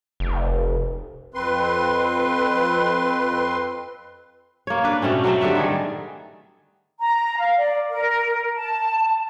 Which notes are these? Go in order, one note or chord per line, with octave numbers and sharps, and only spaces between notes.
F1
F2 C4 B4 C6
A#3 C#5
D4 B4
B2 A3 C4 C#4
F#3 A3 C4 E5
D3 G3 B4 E5
D#3 G#4
A#5
F5
D5
A#4
A5